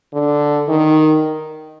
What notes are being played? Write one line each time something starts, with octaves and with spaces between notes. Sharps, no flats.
D3
D#3